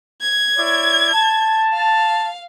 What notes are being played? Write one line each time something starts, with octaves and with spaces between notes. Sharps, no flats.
G#6
E4 C#5 D5
A5
F5